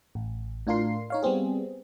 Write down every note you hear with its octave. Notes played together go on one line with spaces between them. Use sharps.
A1
A2 D4 F4 A#4 C6 C7
D#4 C#5 F5
G3 B3 C4 G#4